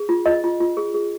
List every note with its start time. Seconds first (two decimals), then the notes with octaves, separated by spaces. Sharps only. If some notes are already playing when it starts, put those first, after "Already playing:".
Already playing: G#4
0.09 F4
0.26 F4 D#5
0.44 F4
0.60 F4
0.77 G#4
0.94 G#4